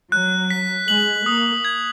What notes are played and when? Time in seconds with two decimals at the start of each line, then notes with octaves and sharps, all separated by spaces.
0.12 F#3 F#6
0.50 B6
0.88 G#3 F#7
1.26 A#3 D#6
1.65 G#6